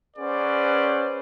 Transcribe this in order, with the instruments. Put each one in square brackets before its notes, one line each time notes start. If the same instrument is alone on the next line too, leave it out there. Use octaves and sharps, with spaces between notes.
[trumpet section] C#4 G#4 B4 C5 D5 F#5